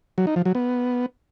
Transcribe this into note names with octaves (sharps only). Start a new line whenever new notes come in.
F#3
D#4
F3
F#3
B3